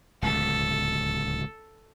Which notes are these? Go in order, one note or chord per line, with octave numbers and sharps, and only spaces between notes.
D1 C#2 B2 A4